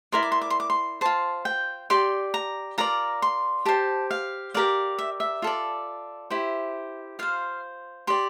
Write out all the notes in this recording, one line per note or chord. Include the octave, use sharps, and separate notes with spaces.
E4 A#4 D5 C6
D6
C6
D6
C6
D6
C6
F4 C5 A5
G5
G4 D5 C6
A#5
F4 A#4 D5 A#5
C6
G4 C5 A5
F5
G4 A#4 D5 F5
E5
E5
F4 A4 D5
E4 G4 C5
F4 C5 F5
G4 D5 C6